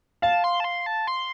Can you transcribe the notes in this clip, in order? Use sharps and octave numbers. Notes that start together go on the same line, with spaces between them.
F5 A5
C6
A5
C6
A5
C6